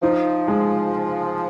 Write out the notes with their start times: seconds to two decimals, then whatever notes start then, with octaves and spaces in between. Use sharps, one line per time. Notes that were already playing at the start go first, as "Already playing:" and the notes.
0.02 F3 D#4
0.48 G#3